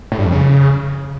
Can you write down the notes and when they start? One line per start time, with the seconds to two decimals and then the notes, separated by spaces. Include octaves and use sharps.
0.12 A2
0.19 G2
0.25 F2
0.32 C#3